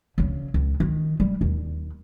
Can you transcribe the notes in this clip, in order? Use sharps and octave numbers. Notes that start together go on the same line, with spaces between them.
D2 C#3
C#2
D#3
G3
D#2